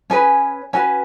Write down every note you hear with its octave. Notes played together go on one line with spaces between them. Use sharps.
C#4 G#4 B4 G#5
C#4 F#4 B4 G#5